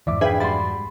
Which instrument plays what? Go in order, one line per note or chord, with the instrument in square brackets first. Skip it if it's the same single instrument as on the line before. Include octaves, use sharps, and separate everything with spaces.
[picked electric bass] F2 G#2 E3 [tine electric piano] D5 E5 D6
[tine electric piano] D4 F5 G5 [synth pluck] G#4 B4 G#5 [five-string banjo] E5
[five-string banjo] G3 G#3 F#4 [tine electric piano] B5 C6 [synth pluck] A6